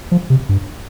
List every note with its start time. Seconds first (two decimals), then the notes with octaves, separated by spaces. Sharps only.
0.12 F3
0.30 C3
0.49 G2